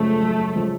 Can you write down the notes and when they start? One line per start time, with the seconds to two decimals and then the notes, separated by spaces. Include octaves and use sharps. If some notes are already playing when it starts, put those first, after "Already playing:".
Already playing: F#2 C#3 F3 G#3 A3
0.23 F#2
0.56 C#3 F3 G#3